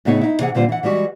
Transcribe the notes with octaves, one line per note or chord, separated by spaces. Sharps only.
A2 C#3 B3 D#4 G#4 C#5
D#4 E4
C3 E3 G#4 F#5
A#2 D3 G3 C4 F4 C5
E3 F#5
E3 G3 G#3 F#4